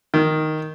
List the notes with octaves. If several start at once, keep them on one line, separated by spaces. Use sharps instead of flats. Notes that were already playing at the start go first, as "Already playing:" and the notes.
D#3